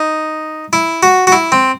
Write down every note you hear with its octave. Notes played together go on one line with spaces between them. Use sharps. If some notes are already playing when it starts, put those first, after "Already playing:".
Already playing: D#4
E4
F#4
F#4
E4
C4